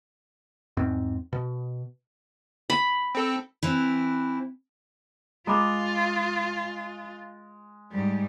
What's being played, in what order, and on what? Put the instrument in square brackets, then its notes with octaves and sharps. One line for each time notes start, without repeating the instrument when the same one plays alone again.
[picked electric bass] E2 G#2 C4
B2
[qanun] B5
[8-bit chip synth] C4 A4
[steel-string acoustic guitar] E3 C4 E4
[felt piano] G#3 [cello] F4 [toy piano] A#5 B5 D6
[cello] G#2 G3